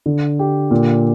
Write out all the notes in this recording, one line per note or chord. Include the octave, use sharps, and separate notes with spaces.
D3
G4
A#2